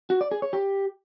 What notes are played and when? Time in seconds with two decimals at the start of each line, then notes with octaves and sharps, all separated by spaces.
0.10 F#4
0.21 D5
0.32 G#4
0.42 C#5
0.53 G4